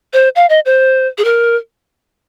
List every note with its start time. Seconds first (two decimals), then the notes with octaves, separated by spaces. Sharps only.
0.13 C5
0.36 F5
0.49 D#5
0.66 C5
1.18 G#4
1.24 A#4